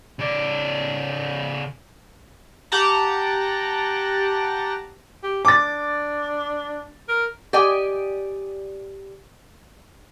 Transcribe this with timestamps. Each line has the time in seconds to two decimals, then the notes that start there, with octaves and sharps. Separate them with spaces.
0.19 C#3 D5
2.72 G4 F#5 A5 A#5
5.23 G4
5.45 D4 D6 A6
7.09 A#4
7.53 G4 D5 D#5 G5 G#5